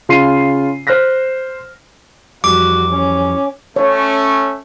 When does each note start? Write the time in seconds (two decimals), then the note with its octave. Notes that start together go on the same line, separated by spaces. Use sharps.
0.09 C#3 F4 C6 C7 D#7
0.87 C5 F6 F#6 A#6 B6
2.44 F2 E3 G3 F#4 D6
2.91 C#4
3.76 A3 C#4 C#5